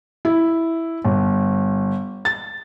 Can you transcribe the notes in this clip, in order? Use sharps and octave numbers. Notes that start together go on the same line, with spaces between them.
E4
G1
A6